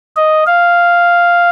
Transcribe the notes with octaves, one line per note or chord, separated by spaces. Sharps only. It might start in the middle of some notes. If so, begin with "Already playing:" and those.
D#5
F5